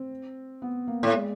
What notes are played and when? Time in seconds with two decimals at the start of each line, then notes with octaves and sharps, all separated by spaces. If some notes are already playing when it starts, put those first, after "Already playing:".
Already playing: C4
0.62 B3
0.87 A#3
1.03 A2
1.13 G#3